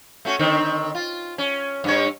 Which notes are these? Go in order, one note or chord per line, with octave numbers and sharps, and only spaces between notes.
A3 C#4 F#4
D3 D#3 C4
F4
C#4
G2 C#4 C#5